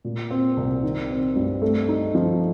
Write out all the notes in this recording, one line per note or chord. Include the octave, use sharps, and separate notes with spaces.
A#2
C4
C2
D#3
C4
G2
A3
D#4
F3